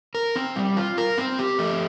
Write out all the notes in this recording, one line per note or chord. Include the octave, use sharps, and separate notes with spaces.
A#4
C4
G3
F4
A#4
C4
G4
A3